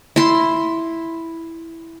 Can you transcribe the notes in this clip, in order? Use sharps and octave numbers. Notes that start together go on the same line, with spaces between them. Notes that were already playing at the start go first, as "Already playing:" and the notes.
E4 C6